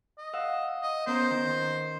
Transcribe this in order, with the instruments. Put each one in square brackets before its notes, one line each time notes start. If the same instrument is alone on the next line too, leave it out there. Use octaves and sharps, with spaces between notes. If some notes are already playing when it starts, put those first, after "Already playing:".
[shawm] D#5
[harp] F5 F#5 E6
[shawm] D#5
[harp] B3 C#4 A#4 [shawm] C5
[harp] D#3